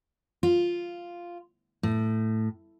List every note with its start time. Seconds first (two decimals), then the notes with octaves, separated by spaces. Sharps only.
0.43 F4
1.83 A2